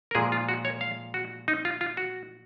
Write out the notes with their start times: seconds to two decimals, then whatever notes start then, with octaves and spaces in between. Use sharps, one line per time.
0.11 A#4
0.15 A#2 F3 G#3 G#4
0.32 F4
0.49 F#4
0.65 C#5
0.81 F5
1.14 F#4
1.48 D#4
1.65 F4
1.81 F4
1.97 F#4